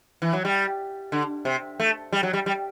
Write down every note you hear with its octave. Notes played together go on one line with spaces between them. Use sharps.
E3
F#3
G3
D3
C3
A3
G3
F#3
G3
G3